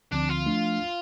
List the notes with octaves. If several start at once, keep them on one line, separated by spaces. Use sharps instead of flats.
D2 D3 F3 C4 D4
F4
F3 A3 D4